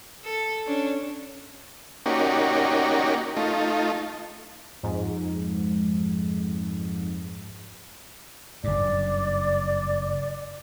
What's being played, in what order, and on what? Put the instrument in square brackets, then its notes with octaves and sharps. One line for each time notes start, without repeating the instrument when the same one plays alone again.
[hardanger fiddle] A4
C#4 D4
[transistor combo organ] A#3 C#4 D#4 F#4 G4 D5
A3 D#4 F4
[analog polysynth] F2 G#2
[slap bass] F#1 G2 [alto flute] D5